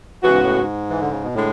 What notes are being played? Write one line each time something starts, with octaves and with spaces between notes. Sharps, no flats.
C#3 E3 G#3 B3 F#4
G#2
A2
G#2
E3
D3
C#3
B2
A2 D3 G#3